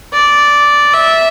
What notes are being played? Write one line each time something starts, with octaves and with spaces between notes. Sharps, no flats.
D5
E5